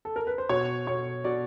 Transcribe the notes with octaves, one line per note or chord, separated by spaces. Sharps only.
A4
A#4
B4
C5
B2 C#5
B2 C#5
B2 D5